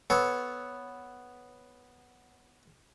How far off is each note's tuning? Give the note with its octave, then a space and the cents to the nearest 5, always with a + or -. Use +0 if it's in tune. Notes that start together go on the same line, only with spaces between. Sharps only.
B3 +0 A4 -20 C#5 +0